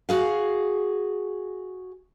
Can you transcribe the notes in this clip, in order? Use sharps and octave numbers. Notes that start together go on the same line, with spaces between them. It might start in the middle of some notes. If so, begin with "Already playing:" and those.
F#4 G#4 F5